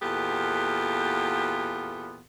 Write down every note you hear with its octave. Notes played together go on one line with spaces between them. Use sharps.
E2 A#2 B3 F4 G4 A4